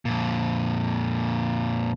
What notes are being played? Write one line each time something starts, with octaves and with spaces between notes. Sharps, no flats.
F2 A#2